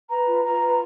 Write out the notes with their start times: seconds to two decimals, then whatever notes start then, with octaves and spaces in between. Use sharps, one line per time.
0.08 B4 A#5
0.26 F4
0.44 F4 A#5
0.61 B4